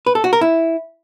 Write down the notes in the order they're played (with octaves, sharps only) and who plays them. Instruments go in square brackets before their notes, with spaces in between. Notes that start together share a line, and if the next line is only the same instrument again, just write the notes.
[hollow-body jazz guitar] B4
A4
F#4
A#4
E4